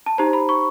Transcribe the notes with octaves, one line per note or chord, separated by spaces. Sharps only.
A5
D#4 G4 C5 A#5
B5
C#6